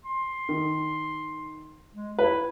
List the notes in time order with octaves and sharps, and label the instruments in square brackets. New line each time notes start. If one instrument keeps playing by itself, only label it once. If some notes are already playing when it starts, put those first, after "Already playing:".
[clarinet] C6
[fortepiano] D#3
[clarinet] G#3
[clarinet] E4 [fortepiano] B4